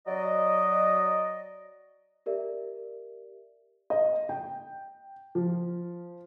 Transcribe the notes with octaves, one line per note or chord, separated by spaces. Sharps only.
F#3 D5 D#5
G4 A#4 D5 E5
D#5
G5
F3